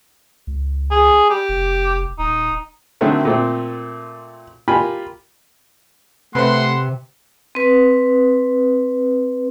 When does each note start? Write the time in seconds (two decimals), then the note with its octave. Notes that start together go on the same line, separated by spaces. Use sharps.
0.47 C#2
0.91 G#4
1.30 G4
1.49 F1
2.19 D#1 D#4
3.01 D3 D#3 F#3 A3 C4 E4
3.25 A#2 A3 C4
4.68 F4 G4 A#4 G#5 B5
6.35 C3 A3 B4 C5 F#5 C6
7.55 C4 B4